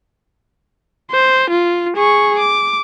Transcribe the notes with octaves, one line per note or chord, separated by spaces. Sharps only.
C5
F4
G#4 C#6
D6